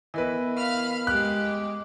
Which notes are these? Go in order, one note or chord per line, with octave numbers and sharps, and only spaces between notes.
E3 B3 A#4 B4 D#5
F5 B5 F6
G#3 G4 F#6
D6